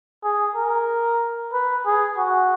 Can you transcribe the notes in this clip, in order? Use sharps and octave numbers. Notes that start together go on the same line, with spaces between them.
G#4
A#4
B4
G#4
F#4